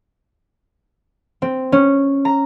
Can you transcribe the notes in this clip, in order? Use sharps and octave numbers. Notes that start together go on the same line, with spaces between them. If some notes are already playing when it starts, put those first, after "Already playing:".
C4
C#4
A#5